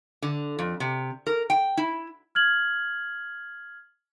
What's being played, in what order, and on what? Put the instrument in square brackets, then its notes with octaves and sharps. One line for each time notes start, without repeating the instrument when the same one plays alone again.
[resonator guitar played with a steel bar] D3
F2
C3
A#4
G5
E4
[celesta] F6 G#6 F#7